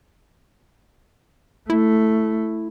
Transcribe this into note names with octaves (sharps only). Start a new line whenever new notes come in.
A3 E4